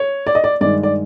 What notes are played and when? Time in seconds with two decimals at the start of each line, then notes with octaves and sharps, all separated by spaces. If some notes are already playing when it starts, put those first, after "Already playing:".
Already playing: C#5
0.27 D5
0.35 D#5
0.44 D5
0.61 G2 D#3 G#3 D5
0.83 D5